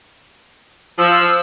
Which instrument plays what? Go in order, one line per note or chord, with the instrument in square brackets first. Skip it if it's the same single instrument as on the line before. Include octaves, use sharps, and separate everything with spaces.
[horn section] F3 [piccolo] E6